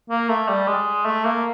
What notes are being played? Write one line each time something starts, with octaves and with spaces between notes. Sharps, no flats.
A#3
A3
G3
G#3
A3
A#3